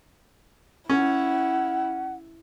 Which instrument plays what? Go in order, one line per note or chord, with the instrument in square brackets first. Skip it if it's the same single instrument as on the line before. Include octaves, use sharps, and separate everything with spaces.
[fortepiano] C#4 [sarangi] E4 [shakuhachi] F#5